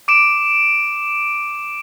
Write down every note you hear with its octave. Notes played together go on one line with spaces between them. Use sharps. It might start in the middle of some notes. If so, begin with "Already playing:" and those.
D6 D7 E7